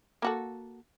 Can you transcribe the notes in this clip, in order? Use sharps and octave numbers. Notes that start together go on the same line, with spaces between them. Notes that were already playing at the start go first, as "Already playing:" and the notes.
A#3 F#4 A4